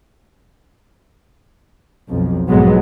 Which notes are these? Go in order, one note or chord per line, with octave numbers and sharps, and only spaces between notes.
B1 F2
B1 F2 G#2 F#3 G#3 B3